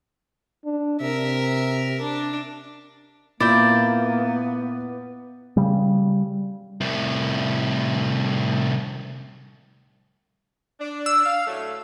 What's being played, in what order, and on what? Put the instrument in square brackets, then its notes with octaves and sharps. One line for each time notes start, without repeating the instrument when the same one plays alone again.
[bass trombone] D4
[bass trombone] C3 [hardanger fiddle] A#4 E5
[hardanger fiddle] D4
[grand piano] A#2 G6 [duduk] A#3 [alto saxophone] B3 [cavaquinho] E4 D5
[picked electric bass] C#3 G3
[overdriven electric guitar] C2 A2
[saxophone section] D4
[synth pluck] E6
[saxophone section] F5
A2 F#3 A3